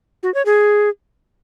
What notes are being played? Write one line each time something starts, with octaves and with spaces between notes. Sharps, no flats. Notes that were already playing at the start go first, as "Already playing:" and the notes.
F#4
C#5
G#4